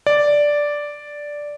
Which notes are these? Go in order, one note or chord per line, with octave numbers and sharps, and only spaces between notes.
D5